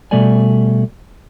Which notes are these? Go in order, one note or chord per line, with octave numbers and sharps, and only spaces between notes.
B2 G3 A3 A4 D5 G#5